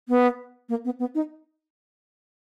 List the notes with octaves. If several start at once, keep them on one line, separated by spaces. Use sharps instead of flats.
B3
A#3
B3
B3
D#4